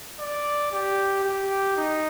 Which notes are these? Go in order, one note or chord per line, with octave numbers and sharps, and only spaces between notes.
D5
G4
G4
D#4